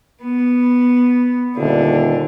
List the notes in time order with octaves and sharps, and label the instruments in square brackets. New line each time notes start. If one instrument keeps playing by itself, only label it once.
[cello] B3
[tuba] D#1 [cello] D3